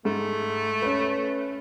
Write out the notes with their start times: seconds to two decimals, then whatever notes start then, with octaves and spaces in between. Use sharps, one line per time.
0.05 G#2 A3
0.82 C#4 B4